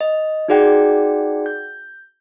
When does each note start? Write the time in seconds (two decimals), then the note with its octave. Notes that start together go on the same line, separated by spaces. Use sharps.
0.01 D#5
0.48 D#4 F#4 G#4 D5 F#5 G5
1.46 G6